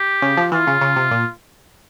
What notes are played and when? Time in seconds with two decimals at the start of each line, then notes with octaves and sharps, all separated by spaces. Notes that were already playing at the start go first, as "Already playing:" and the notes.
Already playing: G4
0.22 C#3
0.37 F3
0.52 E3 F4
0.67 C#3
0.81 C#3
0.96 C3
1.11 A#2